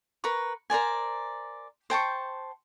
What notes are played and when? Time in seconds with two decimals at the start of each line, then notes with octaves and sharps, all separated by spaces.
0.24 A#4 B4 B5 C#6
0.70 A#4 C5 D5 G#5
1.90 C5 G5 A5 C#6